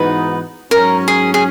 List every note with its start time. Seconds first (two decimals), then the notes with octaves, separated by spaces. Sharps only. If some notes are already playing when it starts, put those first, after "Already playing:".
Already playing: G#2 E3 B3 D#4 F#4 B4
0.71 G#2 F#3 C#4 A#4
1.08 G#4
1.34 G#4